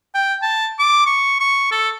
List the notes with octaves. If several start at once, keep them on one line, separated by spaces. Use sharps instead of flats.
G5
A5
D6
C#6
C#6
A4